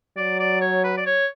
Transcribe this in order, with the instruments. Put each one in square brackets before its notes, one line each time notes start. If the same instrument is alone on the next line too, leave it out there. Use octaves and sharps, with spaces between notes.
[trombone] F#3 [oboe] D5
[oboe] D5
C#5
B4
D5
C#5